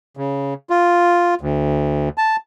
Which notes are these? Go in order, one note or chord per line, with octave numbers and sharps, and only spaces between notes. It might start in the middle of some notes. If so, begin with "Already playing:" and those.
C#3
F4
D2
A5